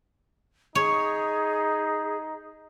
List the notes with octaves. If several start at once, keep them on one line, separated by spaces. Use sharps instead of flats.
D#4 G#4 C#5